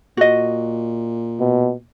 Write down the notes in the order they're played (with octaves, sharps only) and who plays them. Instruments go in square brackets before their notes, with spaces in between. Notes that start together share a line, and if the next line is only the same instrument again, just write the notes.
[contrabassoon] A#2 [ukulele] F#4 D#5
[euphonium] B2